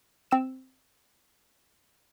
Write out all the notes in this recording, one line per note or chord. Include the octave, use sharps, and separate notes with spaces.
C4 E6 E7